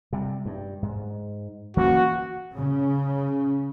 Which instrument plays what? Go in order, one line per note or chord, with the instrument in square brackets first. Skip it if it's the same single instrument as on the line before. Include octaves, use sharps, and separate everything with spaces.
[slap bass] C3 G3
G2
G#2
[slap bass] E3 A#3 C#4 [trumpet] F#4
[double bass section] C#3